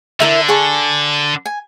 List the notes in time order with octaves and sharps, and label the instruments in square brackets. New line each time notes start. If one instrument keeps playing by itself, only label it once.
[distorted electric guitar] D3 [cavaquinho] E4 A#4 E5
[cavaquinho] G#4 A5 C#6
G#5